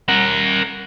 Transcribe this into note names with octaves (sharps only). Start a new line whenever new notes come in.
A#4 F#5